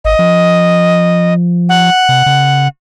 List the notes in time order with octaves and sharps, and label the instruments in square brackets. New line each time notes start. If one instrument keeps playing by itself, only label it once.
[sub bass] G#1 [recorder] D#5
[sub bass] F3
[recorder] F#5
[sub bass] C3
C#3